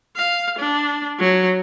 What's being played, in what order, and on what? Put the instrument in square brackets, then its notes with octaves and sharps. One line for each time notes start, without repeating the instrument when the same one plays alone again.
[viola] F5
D4
F#3